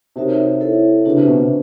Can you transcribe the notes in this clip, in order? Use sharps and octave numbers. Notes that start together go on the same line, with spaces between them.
C3 D#4 F#4 A#4 C#5 E5
E4 A4 C#5 E5
C#3 D4 F#4 B4 E5
C3
B2
B2